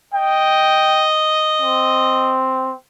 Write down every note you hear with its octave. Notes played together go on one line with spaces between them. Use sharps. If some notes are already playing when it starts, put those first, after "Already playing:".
D#5 G5
C4